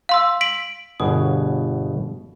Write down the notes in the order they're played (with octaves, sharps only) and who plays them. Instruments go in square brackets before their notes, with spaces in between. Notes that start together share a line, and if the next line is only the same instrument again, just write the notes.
[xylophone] F5 C6 E6
B6 D7 F#7
[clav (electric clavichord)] G1 B2 G#4 [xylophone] D#6